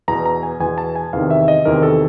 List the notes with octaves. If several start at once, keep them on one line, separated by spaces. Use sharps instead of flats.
E2 B2 A#5
A#5
G#5
E2 B2 G#5
A5
G#5
E2 C3 D#3 F5
E5
D#5
E2 C3 D#3 A#4
A4